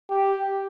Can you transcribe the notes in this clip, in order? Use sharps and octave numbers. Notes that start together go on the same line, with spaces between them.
G4